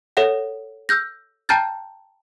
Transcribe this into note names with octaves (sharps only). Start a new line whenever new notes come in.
A4 C#5 E5 F#5
E6 F6 G6 A#6
G5 A5 A#5 F6 G6 A6